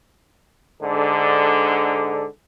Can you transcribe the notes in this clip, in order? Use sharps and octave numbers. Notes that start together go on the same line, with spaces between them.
G#2 D3